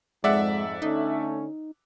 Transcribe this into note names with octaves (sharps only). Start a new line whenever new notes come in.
F2 G#2 G#3 D5 E5 F#5
D3 A3 C#4 D#4